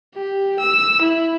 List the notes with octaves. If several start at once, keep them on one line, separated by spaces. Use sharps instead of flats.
G4
E6
E4